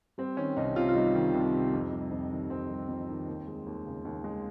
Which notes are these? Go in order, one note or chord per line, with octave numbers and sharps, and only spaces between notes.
G3 C4
D#3 C#4
C2 D#4
C3 F4
F4
G3 D#4
D#3
C2
C3
F2
G3
F2
D#3
F2 C4
G3
F2
D#3
D#2
G#3
D#2
C#3
D#2
G#3